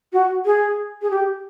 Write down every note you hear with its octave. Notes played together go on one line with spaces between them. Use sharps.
F#4
G#4
G#4
G4